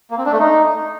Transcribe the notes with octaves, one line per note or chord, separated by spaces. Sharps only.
A#3
C4
D4
A3
D#4